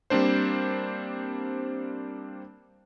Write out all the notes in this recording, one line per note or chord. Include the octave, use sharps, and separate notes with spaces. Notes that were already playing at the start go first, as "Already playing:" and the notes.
G3 A#3 C4 D4 C5